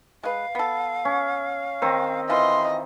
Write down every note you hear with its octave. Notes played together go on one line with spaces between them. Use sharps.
G#3 B4 F5
B3 A4
C#4
D#3 C4
E3 F4 D#5 C6